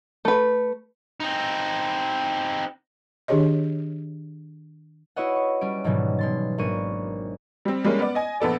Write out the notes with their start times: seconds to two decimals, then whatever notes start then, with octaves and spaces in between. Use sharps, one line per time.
0.25 A3 B4
1.20 C4 D#4
3.28 D#3 D4 G4 G#4 C#5 D#5
5.16 E4 F#4 B4 C#5 D#5 F#5
5.36 C#6
5.61 G3 C#4 D7
5.84 G#2 B2 D#3 E3 F#3 G3
6.19 B2 C6 A6
6.58 G#1 A#3 D4 C#6 D#7
7.65 G3 C4
7.84 G3 G#3 A#3 C#4
7.99 B3 D5
8.15 D#5 G#5
8.40 A#1 B3 A4 D5